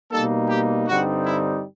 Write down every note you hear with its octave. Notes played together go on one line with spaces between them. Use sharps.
B2 G3 A#3 D#4 A4
G4
G2 D3 G3 C4 D#4 F#4
E4